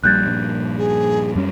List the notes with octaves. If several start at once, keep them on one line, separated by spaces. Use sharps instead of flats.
A#1 G3 F#6 G6 A6
A#1 G2
G#4
F#2 G3 C#4